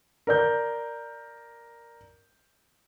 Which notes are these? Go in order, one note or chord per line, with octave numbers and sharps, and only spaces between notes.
A#4 D5 G6